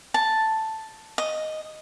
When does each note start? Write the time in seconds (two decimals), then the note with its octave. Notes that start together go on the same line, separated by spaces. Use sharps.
0.14 A5
1.18 D#5